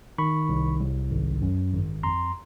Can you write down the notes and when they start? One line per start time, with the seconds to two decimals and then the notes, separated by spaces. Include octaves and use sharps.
0.18 D#3 B5 C#6
0.49 C2
0.80 C2
1.11 G#1
1.42 F#2
1.73 G#1
2.03 F2 A#5 C6